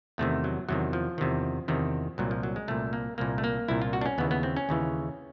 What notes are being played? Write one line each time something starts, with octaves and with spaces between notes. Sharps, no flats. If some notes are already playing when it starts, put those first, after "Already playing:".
E2 C3 D#3 A3
F#3
E2 C3 D#3 F#3
F3
E2 C3 D#3
E2 C3 D#3
C2 A#2 F#3
F3
F#3
G#3
C2 A#2 A3
A#3
C2 A#2 A#3
A3
A#3
C2 A#2 E4
F4
F#4
D4
C#4
D#2 C#3 E3 B3
B3
C4
C#4
D#2 C#3 E3